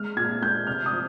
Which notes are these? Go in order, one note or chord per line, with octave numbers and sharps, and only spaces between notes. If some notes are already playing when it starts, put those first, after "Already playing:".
Already playing: G#3 F6
A#2 G#6
G#3 G6
C3 F6
D#6
F3